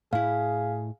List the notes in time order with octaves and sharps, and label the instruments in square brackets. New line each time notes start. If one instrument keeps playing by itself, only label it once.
[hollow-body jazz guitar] A2 E4 [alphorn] G#4 [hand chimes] F5